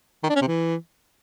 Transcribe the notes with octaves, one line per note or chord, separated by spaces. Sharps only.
D#3
D4
C#4
C3
E3